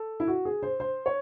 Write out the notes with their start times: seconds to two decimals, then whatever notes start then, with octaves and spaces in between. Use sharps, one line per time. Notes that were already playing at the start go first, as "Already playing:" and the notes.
Already playing: A4
0.20 E4
0.28 F#4
0.45 G#4
0.63 C5
0.80 C5
1.06 C#5